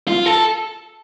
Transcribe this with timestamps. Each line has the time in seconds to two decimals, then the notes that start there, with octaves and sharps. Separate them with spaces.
0.07 F4
0.26 A4